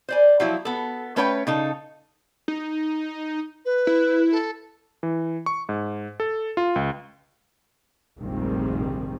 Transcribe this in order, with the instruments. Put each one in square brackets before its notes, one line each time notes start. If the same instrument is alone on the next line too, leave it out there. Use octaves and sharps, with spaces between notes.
[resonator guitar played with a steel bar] C5 D5 G#5
F3 F#3 E4
B3 A4
A3 C#4 B4 C#5 D5 G5
C#3 D#4 A4
[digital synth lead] D#4
[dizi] B4
[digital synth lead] E4
[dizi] A4
[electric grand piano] E3
C#6
G#2
A4
F4
C#2
[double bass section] F1 A#1 G#2 D#3 G3 C4